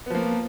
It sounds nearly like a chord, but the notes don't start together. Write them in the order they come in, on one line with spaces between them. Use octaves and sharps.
B3 F3 A#3